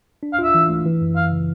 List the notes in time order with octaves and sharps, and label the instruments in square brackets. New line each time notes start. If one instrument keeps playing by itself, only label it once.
[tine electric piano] D4
[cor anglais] F5
[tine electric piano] F4 [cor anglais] E5
[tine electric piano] E3
A3
E3
F#2
[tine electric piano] F#2 [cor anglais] F5
[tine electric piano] C#3